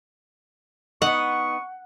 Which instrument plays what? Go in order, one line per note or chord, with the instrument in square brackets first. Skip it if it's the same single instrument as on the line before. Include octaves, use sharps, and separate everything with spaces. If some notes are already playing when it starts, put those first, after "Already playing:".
[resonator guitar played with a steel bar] B3 D#4 D#5 [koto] F#5 [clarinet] C#6